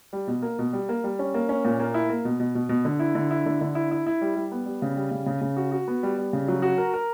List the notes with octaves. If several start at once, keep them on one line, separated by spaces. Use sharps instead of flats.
G3
B2
A#3
B2
G3
A#3
G3
C#4
A#3
C#4
A#2
A#3
E4
A#3
B2
B2
B2
B2
D3
E4
D3
E4
D3
D3
E4
E4
E4
G3
G3
B3
G3
C#3
G3
C#3
C#3
C#3
F#4
F#4
B3
G3
G3
C#3
F#3
F#4
A#4
A#4